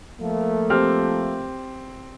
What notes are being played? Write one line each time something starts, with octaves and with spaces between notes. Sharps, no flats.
F3 A3 A#3
C4 G4 F6